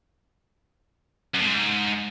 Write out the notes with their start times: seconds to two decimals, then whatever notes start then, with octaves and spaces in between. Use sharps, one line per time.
1.35 F#2
1.40 A2
1.45 G#2